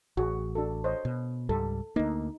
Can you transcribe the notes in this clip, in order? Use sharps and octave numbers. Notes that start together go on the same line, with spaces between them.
A1 F#4 G#4
D4 F#4 A4
C5 C#5 D#5
B2
C#2 G#2 G3 A4
D2 A#3 D#4